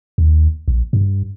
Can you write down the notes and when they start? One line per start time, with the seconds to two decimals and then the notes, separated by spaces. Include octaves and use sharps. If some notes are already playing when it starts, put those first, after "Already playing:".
0.18 D#2
0.68 A#1
0.93 G2